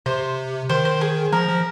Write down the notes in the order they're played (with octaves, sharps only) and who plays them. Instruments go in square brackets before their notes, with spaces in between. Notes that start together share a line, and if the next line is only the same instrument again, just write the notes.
[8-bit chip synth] C3 [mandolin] C5
[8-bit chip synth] D#3 [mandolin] C5
[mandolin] C5
G#4
[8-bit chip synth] F3 [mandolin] A#4
[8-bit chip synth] F3